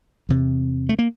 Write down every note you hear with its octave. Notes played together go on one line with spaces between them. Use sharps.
E2 C3
A3
A#3